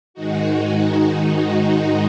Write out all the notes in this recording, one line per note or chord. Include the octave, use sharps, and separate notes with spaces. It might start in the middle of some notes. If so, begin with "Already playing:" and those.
G#2 D#3 G#3 D#4 F#4